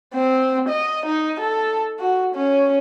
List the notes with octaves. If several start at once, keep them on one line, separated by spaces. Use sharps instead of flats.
C4
D#5
D#4
A4
F#4
C#4